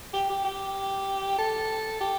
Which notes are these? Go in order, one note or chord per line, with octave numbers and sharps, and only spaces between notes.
G4
G4
G4
A4
G4